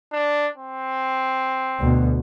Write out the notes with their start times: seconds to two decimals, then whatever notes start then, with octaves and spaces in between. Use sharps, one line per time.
0.13 D4
0.58 C4
1.80 D2 B2